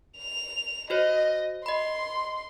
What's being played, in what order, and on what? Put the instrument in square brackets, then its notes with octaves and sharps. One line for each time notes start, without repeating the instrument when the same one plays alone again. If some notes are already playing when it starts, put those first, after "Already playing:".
[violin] F7
[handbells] F#4 C5 C#5 [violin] D#5
[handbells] D#5 B5 [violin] C6